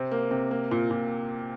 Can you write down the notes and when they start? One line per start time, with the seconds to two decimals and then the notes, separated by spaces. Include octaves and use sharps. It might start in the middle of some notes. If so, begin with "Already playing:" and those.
Already playing: C3 C4
0.11 A#3
0.31 C3
0.51 A#3
0.71 A#2
0.91 A#2